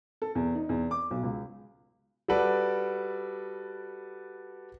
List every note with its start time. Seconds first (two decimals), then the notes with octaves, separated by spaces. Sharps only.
0.22 A4
0.35 E2
0.55 D#4
0.69 E2
0.91 D6
1.11 B1
1.23 C#2
2.28 G3 F#4 A4 B4 D5